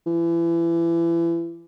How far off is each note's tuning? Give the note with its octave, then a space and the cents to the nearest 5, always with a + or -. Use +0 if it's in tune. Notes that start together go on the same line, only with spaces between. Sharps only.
E3 +30